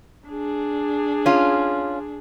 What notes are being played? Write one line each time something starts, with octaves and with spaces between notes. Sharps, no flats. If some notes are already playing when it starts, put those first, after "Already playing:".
D4 G#4
C#4 F4